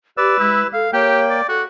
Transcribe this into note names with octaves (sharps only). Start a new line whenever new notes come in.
G4 B4 D5 E6
G#3 E4
A4 F5
A#3 G4 C#5 G5
D5
F#4 A4